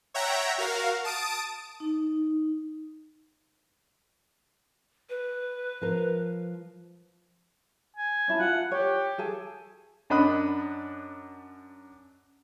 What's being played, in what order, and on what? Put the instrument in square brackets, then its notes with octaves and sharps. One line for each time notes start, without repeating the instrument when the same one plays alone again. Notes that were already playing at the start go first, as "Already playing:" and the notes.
[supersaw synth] C#5 E5 F#5 G5 A#5
F#4 A#4 F5
A5 D#6 D7
[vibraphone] D#4
[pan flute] B4
[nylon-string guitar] F3 A#4
[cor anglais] G#5
[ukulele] C#4 E4 A5
[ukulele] F4 [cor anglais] F#5
[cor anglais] G4 [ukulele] C#5
[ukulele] G#4 A4 G#5
[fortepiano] F#2 D4 D#5 B5 D#6 F#6